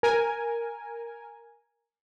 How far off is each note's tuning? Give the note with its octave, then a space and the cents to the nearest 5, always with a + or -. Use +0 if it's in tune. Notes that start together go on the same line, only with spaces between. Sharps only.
A#4 +0 G#5 +0